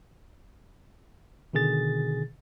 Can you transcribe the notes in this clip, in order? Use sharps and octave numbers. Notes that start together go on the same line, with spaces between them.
B2 D3 D#3 G#4 A6